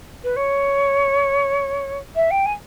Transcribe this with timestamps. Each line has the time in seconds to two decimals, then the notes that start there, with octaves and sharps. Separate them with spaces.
0.23 B4
0.36 C#5
2.15 E5
2.30 G5
2.45 G#5